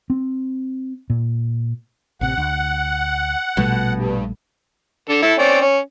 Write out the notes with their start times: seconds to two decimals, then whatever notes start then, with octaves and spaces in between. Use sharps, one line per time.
0.10 C4
1.10 A#2
2.21 A1 C3 F#5
2.37 D2
3.57 A#1 B2 G3 A3
3.94 G2
5.09 D3 A4
5.22 E4 A4
5.39 C4 C#4 D5
5.61 C#4